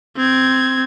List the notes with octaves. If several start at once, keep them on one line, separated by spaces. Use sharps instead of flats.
C4 G#6